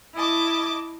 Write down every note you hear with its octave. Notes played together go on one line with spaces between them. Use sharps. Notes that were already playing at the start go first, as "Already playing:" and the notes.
E4 D#5 A5 D6